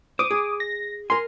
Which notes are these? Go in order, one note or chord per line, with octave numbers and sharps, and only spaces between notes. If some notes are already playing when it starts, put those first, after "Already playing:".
C5 D6 D#6
G#4
A#6
A#4 G#5 C6